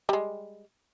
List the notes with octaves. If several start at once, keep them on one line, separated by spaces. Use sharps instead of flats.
G3 G#3